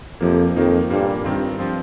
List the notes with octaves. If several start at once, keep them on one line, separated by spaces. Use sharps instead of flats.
F2 C3 F3 A#3
F2 D#3 A#3 D#4
G2 A#2 G3 A#3
G2 D#3 C4 F4
F3 C4 F4